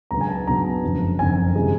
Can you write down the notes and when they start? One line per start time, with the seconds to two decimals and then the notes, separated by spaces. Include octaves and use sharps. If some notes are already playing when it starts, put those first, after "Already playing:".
0.11 C#2 B2 F#3 B3 D4 A#5
0.21 G#5
0.29 A5
0.47 C#2 B2 F#3 B3 D4 A#5
0.83 F#1 F2 D3
1.19 F#1 F2 D3 G#5
1.55 C3 E3 G#3